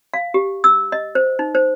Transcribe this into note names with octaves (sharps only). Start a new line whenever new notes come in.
F5
G4
E6
D#5
C5
D#4
C5